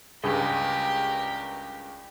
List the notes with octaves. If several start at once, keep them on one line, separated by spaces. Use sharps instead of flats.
C#2 G2 G4 G#4 A#4